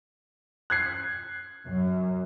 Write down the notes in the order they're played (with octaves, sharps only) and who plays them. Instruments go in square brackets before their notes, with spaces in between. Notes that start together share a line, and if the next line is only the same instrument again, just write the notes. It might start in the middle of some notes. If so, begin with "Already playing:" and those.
[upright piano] F#6 G#6 C7
[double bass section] F#2